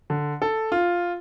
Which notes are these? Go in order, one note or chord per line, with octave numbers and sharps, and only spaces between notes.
D3
A4
F4